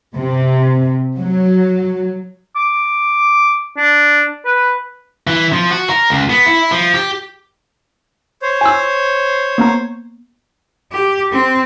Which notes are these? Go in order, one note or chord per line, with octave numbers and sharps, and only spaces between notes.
C3
F#3
D6
D4
B4
E3
F3
F#4
A#4
C#2
B3
E4
F3
G4
C5 C#5
G#5 E6
A#3 B3 A#5
G4
C4